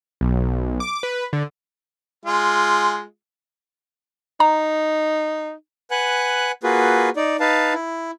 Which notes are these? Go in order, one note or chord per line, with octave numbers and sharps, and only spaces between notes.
B1
D6
B4
D3
G#3 F4
D#4 A#5
B4 F#5 G#5 F#6
A#3 F4 F#4 G#4 B4
D#4 D5
D#4 B4 F5 A5
E4